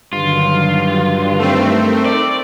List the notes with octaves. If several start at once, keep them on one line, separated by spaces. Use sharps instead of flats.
G2 D3 D#3 F#3 F4
A3 C4 D#4 A#4
D5